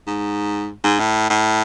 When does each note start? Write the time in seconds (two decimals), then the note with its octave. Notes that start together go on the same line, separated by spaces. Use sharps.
0.07 G#2
0.84 G#2
1.00 A2
1.30 A2